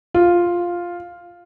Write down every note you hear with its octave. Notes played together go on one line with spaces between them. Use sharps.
F4